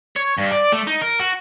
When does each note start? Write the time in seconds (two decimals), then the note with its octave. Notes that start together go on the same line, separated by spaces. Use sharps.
0.16 C#5
0.38 G2
0.52 D5
0.72 A3
0.87 D#4
1.01 A#4
1.20 F#4